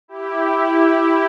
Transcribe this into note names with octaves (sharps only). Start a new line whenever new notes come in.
E4 G4
E4 G4